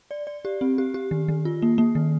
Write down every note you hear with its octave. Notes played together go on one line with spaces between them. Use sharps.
D5
D5
G4
C4
G4
G4
D#3
D#3
F4
A#3
A#3
D#3